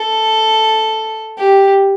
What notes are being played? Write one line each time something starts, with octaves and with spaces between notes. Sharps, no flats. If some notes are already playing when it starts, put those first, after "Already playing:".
Already playing: A4
G4